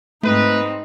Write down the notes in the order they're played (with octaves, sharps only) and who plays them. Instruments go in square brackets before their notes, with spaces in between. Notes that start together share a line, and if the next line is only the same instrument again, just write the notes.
[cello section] G#2 C4 [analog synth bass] A3 [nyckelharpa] D#4 [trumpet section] B4